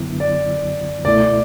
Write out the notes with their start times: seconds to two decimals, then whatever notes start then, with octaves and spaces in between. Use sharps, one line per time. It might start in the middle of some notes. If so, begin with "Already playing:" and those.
Already playing: F#2 D3 F#3 B3 E4
0.20 D5
1.05 C#2 B2 A3 E4 D5